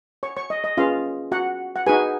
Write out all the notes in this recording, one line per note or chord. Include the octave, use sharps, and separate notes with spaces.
C#5 C#6
C#5 C#6
D#5
D#5
C#4 F4 G#4 B4 F5
F#4 F#5
F#5
D#4 F#4 G#4 B4 G#5